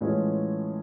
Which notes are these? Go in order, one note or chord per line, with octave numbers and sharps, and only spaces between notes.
A2 E3 G#3 C#4 F4